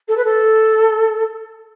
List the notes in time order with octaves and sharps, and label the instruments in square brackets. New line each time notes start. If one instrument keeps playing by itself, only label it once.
[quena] A4
B4
A4